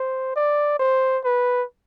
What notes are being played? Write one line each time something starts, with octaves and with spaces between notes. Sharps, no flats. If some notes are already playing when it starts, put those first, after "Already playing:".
Already playing: C5
D5
C5
B4